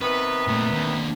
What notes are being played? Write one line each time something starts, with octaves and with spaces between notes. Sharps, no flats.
C3 D#3 B3 B4
A#2 A3
D#2 D3